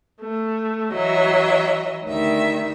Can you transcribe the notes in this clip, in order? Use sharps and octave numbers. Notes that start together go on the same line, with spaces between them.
A3
E3 F#3 D#5 E5
D2 D#3 G3 E5